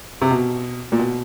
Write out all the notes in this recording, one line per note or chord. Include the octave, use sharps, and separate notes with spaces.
C3
B2
A#2
B2